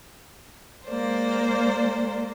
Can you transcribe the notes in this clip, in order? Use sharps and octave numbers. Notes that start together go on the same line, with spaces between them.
G#3 A#3 C5 D5